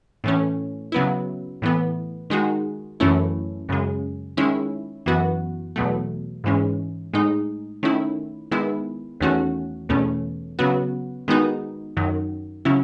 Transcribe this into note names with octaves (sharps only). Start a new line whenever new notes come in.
A2 E3 A3 C#4
C#3 F#3 B3 E4
A2 E3 B3
D#3 G#3 D#4 F#4
F#2 E3 A3 C#4 E4
F#2 C#3 G#3
D#3 G#3 C#4 E4
F#2 E3 B3 F#4
E2 B2 F#3 A3
G#2 E3 G#3 C#4
A2 G#3 D#4
D#3 A3 C#4 E4
D#3 G#3 B3 E4
E2 D#3 A3 C#4 F#4
E2 B2 A3 C#4
C#3 F#3 B3 F#4
D#3 G#3 B3 D#4 F#4
F#2 D#3 F#3
C#3 F#3 C#4 E4